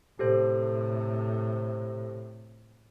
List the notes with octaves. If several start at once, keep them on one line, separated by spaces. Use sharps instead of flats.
A2 C3 G4 A4 C5